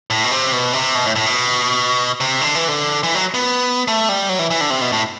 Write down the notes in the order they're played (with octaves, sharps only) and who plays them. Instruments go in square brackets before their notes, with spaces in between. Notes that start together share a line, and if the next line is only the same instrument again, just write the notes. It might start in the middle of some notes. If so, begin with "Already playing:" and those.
[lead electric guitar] A2
B2
C3
B2
C3
B2
A2
A2
B2
C3
D3
E3
D3
E3
F#3
B3
A3
G3
F#3
E3
E3
D3
C3
B2
A2